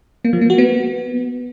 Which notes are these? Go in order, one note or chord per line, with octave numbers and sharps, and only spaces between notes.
A#3
F3
A#3
F#4
B3